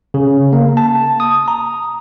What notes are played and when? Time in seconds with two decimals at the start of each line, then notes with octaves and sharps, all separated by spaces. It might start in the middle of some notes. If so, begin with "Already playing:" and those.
0.14 C#3
0.53 A#3
0.77 A5
1.20 D#6
1.48 A#5